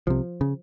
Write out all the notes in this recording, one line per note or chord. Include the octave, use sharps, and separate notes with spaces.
C2 C3 F3
C#3